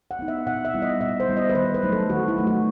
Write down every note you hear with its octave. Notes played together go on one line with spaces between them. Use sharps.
F#5
B3 D#4
E5
B2 F#5
E5
G3 B3 E4
D#5
B2 E5
C5
G3 B3 E4
D#5
B4
D#3 C5
B4
F#3 A3 D#4
A4
D#3 F#4
E4
F#3 A3 D#4
F#4